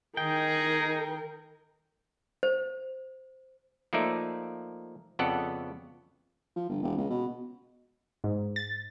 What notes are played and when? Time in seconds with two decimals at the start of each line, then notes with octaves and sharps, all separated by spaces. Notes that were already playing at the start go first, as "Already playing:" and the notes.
0.17 D#3 D#4 G#4 A#4 G5
2.43 C5
3.93 F3 A3 A#3 D#4 D5 E5
5.19 F2 C#3 B3 A4 D5 F#5
6.56 F3
6.69 G1
6.83 E1
6.97 C#2
7.10 B2
8.24 G#2
8.56 A6